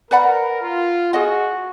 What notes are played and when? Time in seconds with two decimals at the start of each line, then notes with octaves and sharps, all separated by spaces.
0.11 A#4 B4 D5 F#5 B5
0.62 F4
1.13 F#4 G#4 D#5 F#5